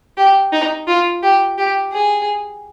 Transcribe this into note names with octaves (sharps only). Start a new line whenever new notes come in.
G4
D#4
F4
G4
G4
G#4